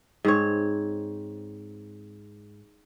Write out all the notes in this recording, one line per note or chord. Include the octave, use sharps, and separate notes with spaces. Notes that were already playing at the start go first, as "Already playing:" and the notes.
G#2 C4 C#5